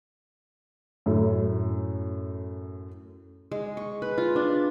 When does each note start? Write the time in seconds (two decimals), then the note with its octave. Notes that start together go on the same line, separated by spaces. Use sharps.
1.06 F#2 A2 A3
3.51 G#3
3.77 C#6
4.02 B4
4.18 F4
4.36 D4